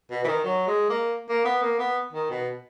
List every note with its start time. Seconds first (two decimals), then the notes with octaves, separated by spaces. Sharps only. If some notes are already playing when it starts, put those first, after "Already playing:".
0.10 B2
0.24 E3
0.28 D#3
0.44 F#3
0.67 G#3
0.89 A#3
1.29 A#3
1.45 B3
1.62 A#3
1.79 B3
2.13 D#3
2.30 B2